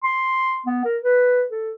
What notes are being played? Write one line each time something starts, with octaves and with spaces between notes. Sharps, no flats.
C6
B3
A#4
B4
A4